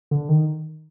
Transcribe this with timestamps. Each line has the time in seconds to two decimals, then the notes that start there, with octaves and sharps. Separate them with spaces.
0.11 D3
0.29 D#3